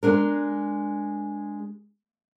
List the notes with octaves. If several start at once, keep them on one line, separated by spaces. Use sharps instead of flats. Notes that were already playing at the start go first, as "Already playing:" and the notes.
G#3 D4 A#4